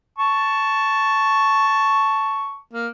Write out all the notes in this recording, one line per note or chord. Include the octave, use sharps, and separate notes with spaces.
A5 C#6
A#3